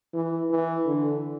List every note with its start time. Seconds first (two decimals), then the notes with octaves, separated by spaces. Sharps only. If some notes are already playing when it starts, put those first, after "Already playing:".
0.13 E3
0.50 E3
0.86 D3